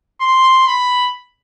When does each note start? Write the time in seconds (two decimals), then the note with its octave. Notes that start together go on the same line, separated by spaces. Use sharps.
0.21 C6
0.67 B5